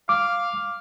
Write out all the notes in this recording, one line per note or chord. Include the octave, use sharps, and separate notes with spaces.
F5 D6